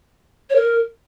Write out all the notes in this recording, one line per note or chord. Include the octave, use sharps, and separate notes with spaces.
C#5
A#4